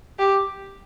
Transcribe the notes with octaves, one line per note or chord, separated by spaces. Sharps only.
G4